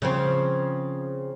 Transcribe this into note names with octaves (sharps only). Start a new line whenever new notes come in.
C#3 F3 C4